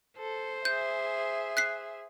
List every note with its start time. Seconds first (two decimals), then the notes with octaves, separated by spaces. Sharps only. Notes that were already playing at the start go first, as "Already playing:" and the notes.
0.18 A4 C5
0.65 G#4 E5 G6
1.57 F#6 B6 C7